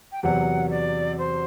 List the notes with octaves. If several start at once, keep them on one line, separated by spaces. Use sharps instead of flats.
G5
E2 C3 F#3 B3 F#4 F#5
D5
C5